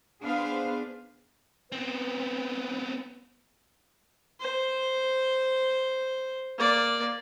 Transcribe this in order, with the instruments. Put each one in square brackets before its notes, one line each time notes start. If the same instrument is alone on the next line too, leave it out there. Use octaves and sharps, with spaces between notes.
[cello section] B3 D4 G#4 B4 C5 F5
[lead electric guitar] B3 C4 [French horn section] B4
[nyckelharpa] C5
A#3 D5